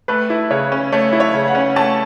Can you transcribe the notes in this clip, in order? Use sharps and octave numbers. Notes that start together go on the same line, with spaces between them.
A3 B4
E4
C#3 C#5
C#4
A3 C#5
E4
C#5
C#3
F#5
C#4
A3 A5